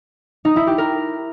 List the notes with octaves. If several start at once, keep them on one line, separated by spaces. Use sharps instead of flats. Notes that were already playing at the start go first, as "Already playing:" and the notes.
D#4
E4
G4
A#4